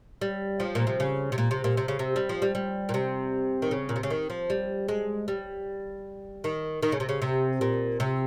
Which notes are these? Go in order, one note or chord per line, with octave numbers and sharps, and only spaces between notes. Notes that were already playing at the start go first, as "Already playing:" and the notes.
G3
F3
A#2
C3
C#3
C3
A#2
C3
A#2
C3
C#3
C3
G3
F3
G3
G3
A#2
C3
D#3
C#3
A#2
C3
C#3
D#3
F3
G3
G#3
G3
D#3
D#3
C#3
C3
C#3
C3
A#2
C3